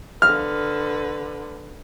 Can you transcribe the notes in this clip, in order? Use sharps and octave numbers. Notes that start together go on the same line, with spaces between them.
D3 B4 F6